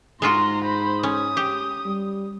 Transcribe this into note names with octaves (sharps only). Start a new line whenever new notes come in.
G#2 G#3 F4 F#4 A#5 C6
C5 B5
C#4 D#6
G4
G3